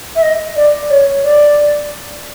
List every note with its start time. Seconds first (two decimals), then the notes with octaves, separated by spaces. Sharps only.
0.16 E5
0.22 D#5
0.56 D5
0.90 C#5
1.24 D5